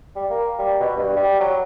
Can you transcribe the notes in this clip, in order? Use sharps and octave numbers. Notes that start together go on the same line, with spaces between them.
G3
A#3
G3
B2
G2
G3
F#3